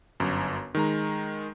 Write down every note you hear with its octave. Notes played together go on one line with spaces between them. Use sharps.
G1 F#2
D#3 G#3 A#5